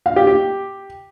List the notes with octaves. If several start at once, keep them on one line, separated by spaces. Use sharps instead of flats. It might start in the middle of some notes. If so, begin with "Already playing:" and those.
F5
G4
G4